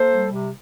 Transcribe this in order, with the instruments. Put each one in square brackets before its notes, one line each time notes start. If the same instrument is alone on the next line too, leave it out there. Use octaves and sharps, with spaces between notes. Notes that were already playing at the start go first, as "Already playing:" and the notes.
Already playing: [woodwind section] A#3 A4 C5
G3
C3